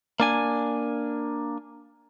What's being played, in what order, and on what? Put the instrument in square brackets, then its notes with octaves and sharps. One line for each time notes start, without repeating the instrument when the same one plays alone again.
[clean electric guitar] A#3 D4 G#5